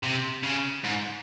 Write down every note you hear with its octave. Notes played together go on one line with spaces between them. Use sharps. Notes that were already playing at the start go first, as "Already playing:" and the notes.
C3
C#3
G#2